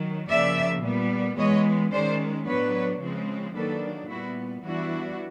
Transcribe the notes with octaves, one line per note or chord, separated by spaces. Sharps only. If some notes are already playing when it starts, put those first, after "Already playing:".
Already playing: D#3 F#3
C#3 F3 A#3 D5 E5
A#2 G3 B3
E3 G#3 B3 C#5 D#5
D#3 G#3 C#4 C5 D5
A2 F#3 B3 D4 B4 C#5
C#3 F3 G#3 C4
D#3 F#3 A#3 D4 A4 B4
A#2 G3 B3 E4 F#4
E3 G3 B3 D4 E4 F#4